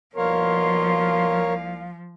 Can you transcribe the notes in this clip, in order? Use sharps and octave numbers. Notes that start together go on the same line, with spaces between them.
C2 B2 F3 A#3 A#4 C#5 F5 C6